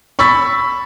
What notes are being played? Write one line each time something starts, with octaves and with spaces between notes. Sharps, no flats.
B5 C#6 E6 A6 B6